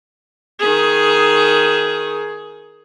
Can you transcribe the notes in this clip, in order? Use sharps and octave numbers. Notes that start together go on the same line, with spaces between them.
D#3 G#4